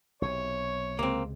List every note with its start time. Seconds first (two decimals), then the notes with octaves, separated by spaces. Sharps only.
0.22 B1 C3 C#5
0.99 C#2 C3 G#3 A#3 C4